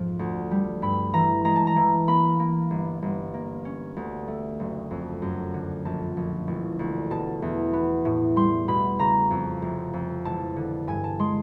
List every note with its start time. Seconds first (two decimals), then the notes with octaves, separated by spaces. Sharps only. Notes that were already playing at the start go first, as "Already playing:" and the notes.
Already playing: F2 G#2 F3
0.19 D2
0.51 G3
0.82 G2 B5
1.13 E3 A#5
1.45 G#3 A#5
1.56 A5
1.67 A#5
1.76 E3
2.08 A#3 B5
2.39 A#3
2.70 G1
3.02 G1
3.34 A#3
3.65 C#4
3.96 D2
4.28 A3
4.59 F#1
4.91 F2
5.22 F#2
5.54 D3
5.85 A#1 A5
6.17 A#1
6.47 E1
6.79 D2
7.10 B2 A5
7.42 E2
7.73 B3
8.05 A2
8.36 G3 C6
8.68 B2 B5
8.99 C#3 A#5
9.31 F2
9.62 F1
9.93 F2
10.25 E1 A5
10.56 D3
10.87 G2 G#5
11.04 A5
11.19 G#3 C6